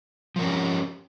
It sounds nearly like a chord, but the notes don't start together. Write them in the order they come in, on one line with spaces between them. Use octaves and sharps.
F3 A#4 C#4 G4